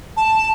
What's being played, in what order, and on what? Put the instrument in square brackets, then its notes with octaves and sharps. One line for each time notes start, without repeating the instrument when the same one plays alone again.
[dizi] A5